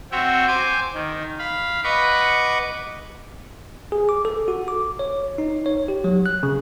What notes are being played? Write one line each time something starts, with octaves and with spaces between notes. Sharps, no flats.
C4 F#4 C#5 E5 G5
C5 G#5 D6
D#3
F5 B5
B4 D#5 F#5 B5 C#6 D6
G#4
D6
A4
F#4
D6
C#5
D#4
C#5
G4
F#3
F#6
C#3